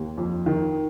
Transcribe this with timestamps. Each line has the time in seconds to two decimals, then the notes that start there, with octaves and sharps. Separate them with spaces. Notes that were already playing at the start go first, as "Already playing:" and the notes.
Already playing: D#2
0.18 F2
0.46 D#3